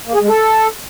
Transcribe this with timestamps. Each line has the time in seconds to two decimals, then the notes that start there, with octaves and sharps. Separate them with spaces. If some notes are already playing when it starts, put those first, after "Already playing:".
0.07 A#3
0.14 G#4
0.21 G#3
0.28 A4